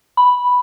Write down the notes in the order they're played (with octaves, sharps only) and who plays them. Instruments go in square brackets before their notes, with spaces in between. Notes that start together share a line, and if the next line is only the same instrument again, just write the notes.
[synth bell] B5